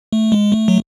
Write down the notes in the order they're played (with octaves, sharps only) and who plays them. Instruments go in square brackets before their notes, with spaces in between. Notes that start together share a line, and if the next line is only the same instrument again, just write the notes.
[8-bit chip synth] A3
G#3
A3
F#3